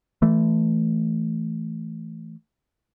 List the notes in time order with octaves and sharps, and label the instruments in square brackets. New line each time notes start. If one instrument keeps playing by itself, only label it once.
[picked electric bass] E3 A3